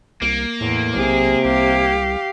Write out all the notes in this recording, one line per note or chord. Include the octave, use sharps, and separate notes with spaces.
C2 A#3
E2 A2
B1 C3 G#4
C2 G4 F5